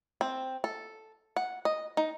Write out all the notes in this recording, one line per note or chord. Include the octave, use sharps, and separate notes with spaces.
C4
A4
F#5
D#5
D#4